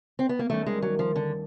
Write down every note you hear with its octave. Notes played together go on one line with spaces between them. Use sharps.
C4
B3
A#3
D#2 D#3 G3 A3 A#3 C#4
G#3
F#3
F3
D3